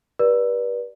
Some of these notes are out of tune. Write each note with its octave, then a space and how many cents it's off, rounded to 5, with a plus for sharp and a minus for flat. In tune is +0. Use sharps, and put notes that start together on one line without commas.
G4 -10 B4 -35 D5 +0